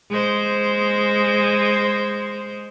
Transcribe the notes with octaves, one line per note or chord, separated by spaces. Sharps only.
G#3 C5